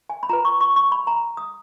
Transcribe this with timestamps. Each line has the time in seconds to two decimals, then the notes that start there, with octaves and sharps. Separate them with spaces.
0.10 G#5
0.23 B5
0.29 F4 B4 A#5
0.45 C#6
0.61 C#6
0.76 C#6
0.92 B5
1.07 A#5
1.37 D#6